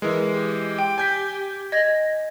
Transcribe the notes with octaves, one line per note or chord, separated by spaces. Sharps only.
E3 G#3 A#4
G4
G5
G#5 G6 B6
D#5 G#6 A#6